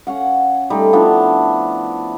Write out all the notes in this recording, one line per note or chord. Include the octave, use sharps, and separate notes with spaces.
C#4 F5 F#5
G3 A3 D#4
F3 B3 D4 E4